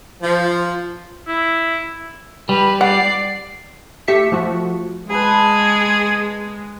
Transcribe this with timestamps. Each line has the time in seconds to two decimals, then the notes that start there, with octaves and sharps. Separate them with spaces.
0.22 F3
1.27 E4
2.49 G3 B4
2.81 D5 F#5 C7
4.08 A3 G4 E5 B6 C#7
4.32 F3 A3 F#4
5.10 G#3 G#4 B4 A5 B5